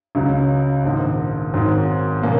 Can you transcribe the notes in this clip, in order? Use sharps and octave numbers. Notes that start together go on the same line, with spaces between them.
C#2 C#3 F#3
A#1 G#2 D#3
G#1 G#2 D#3 F#3
B2 A#3 C#4